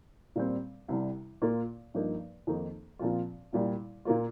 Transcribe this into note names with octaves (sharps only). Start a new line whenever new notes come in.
A#2 G3 C4
C2 C3 G3
A#2 A#3 F4
G2 F3 A#3 D#4
F2 D#3 A#3 D#4
A#2 F3 C4 F4
C2 A#2 G3
A#2 A#3 F4